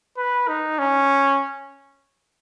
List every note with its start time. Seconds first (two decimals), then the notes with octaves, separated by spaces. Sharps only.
0.18 B4
0.48 D#4
0.79 C#4